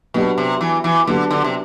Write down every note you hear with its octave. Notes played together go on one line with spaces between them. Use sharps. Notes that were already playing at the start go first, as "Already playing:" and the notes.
B2 F#3 B3 D4 G4
C3
E3
E3
D3 F#3 B3 D4 G4
D3
C3